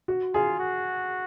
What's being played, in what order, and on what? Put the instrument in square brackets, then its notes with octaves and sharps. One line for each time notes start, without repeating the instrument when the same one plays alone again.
[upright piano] F#4
[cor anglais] F4 [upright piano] G#4
[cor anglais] F#4